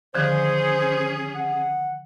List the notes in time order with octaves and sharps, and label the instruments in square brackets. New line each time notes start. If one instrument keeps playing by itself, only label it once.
[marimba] D3 D#3 F3 [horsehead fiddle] C#4 G#4 [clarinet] C5
[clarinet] F#5